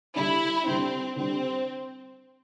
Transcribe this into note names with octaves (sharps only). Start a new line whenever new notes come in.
D3 G3 D4 E4
D3 G3 C4 D4
D3 G3 C4 D4